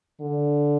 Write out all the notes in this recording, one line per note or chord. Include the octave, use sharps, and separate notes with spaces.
D3